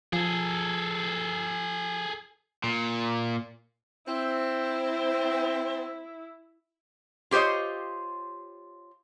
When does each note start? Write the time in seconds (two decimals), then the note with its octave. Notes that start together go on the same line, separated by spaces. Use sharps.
0.13 F3 G#4 A4
2.64 A#2
4.07 C4 E4
7.31 F4 G4 C5 C#5 D#5